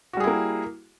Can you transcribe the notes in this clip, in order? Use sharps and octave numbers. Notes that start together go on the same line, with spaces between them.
G3 A#3 E4 F#4 G#4